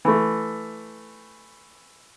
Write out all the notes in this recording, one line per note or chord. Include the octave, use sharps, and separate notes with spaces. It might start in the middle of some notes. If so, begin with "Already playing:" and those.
E3 A3